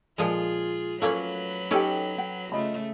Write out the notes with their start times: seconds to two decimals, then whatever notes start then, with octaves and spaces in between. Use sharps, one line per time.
0.18 A#2 F3 G#3 F4 G#4
1.02 F#3 A3 A#3 C#4 F4 B4 F5
1.71 C#4 D#4 G4 A4 G5
2.18 C#5 F#5 G5
2.52 C#3 A3 F4 D#5 B5